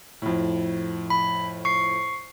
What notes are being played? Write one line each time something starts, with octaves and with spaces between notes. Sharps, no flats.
F2 A2
B5
C#6 C7